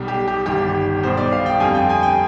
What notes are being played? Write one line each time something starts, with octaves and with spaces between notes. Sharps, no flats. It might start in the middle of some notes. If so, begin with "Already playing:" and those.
Already playing: B1 B2 G3
G4
G4
G1 G2 D#3 G3 G4
B1 B2 G3 C5
D5
F5
G5
F2 D3 G3 G#5
G5
G#5
G5